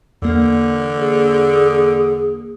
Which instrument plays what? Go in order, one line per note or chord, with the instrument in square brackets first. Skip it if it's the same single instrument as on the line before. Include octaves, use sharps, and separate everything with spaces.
[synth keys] E2 A#3 [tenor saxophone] D3
[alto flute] G#4